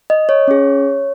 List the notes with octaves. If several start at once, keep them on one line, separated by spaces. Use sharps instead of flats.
D#5
C#5
C#4 G#4